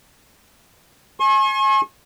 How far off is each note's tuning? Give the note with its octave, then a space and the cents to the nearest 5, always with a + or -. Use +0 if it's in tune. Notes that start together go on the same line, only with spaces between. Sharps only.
G#5 +30 C#6 -45